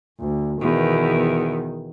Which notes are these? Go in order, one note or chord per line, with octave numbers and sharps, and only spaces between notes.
D2
E2 B2 D#3